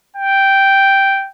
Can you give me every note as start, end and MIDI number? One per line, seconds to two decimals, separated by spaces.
0.16 1.30 79